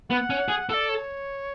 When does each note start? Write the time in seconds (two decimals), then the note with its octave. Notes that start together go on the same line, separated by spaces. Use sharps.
0.10 B3 F#5
0.30 C#4
0.49 G#4
0.69 A4 D5 F#5
0.89 C#5